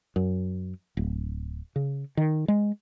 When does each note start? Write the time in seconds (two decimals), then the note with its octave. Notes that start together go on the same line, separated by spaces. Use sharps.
0.16 F#2
0.97 D1
1.76 C#3
2.17 D#3
2.48 G#3